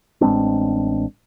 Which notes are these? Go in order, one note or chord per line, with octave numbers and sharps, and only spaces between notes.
A1 G#3 C4 D4